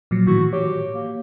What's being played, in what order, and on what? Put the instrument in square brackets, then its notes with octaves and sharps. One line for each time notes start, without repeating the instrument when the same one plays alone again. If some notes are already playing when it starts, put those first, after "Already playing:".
[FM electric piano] A#2 F3 F#3
[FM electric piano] A2 D#3 E3 [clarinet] F#4
[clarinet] G4 [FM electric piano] C#5
[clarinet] A#3